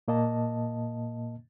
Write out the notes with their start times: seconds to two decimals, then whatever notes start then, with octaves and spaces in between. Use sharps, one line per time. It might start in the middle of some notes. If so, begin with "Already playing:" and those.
0.08 A#2 A#3 D#5 A5